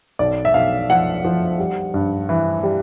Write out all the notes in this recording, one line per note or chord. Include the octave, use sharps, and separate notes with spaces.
B1 D5
E5
B1 F5
F3 F#5
F3
G3
G2
E3
G3